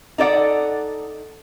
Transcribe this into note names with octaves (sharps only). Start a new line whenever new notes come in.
D#4 A4 D5 F#5